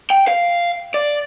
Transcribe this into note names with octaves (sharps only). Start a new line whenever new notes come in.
G5
F5
D5